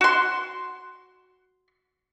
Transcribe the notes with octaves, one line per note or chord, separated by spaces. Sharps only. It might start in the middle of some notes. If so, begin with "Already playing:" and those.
F#4 C6